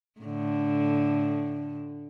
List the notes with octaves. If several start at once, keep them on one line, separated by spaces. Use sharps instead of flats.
A2 D3